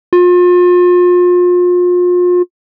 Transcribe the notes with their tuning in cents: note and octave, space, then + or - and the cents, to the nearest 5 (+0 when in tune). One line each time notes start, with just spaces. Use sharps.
F4 +35